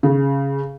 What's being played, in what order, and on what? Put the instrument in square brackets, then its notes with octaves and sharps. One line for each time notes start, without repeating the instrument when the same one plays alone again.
[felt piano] C#3